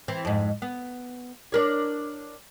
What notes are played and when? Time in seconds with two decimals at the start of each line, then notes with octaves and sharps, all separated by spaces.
0.08 E3 C4
0.25 F2 G#2
0.62 B3
1.52 D4 A#4 C#5